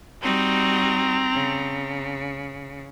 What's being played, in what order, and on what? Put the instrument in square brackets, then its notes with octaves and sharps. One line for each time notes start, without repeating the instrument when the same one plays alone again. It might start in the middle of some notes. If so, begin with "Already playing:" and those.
[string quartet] G3 D#4 F#4 [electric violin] C4 A#5
[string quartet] C#3